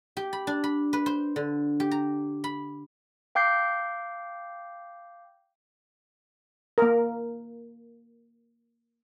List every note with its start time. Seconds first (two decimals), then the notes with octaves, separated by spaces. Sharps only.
0.17 G4
0.33 B5
0.47 D4
0.64 B5
0.93 B4
1.06 C5
1.36 D3
1.80 G4
1.91 A#5
2.44 B5
3.35 F5 G5 D6 G6 C7
6.78 A#3 A#4